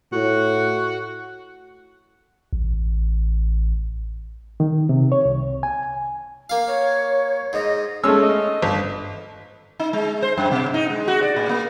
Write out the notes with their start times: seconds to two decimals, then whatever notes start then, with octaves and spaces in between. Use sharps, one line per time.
0.12 A2 F#4
2.53 A1
4.60 D#3
4.89 C3
5.12 C#5
5.25 C2
5.63 G#5
6.50 A#3 F5
6.67 C#5
7.53 G#2 D#5
8.04 G#3 A3 C#4 E6
8.22 D#5
8.62 G1
9.79 D#4
9.93 G#3
10.22 C5
10.38 F#2
10.51 B2
10.74 D#4
10.90 G#3
11.08 F#4
11.23 D5
11.36 A2
11.49 A#3